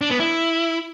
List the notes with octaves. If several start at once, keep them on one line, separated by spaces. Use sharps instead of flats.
D4
B3
E4